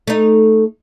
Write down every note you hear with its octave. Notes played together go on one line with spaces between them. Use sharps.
A3 D#4